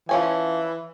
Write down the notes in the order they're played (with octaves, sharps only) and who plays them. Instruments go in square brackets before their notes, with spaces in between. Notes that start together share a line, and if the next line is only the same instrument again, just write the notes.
[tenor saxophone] E3 [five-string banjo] F3 C#4 G#5